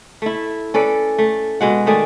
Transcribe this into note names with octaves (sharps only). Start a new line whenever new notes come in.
A3 E4
C#4 A4 B4 D5
A3
B2 G#3 F#5
D#3 A3 G#4 D5